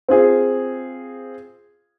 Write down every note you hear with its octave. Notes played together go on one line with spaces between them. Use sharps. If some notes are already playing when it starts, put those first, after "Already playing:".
C4 F4 G#4